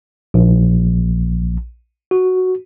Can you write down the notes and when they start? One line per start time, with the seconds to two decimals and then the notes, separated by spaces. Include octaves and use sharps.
0.34 A#1
2.11 F#4